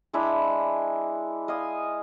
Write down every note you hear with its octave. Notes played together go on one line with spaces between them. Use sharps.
G#3 D4 E4 B5
D#5 F5 G#5 D#6